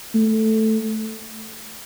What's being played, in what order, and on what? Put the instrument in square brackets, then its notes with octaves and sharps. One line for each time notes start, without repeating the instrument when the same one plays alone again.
[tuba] A3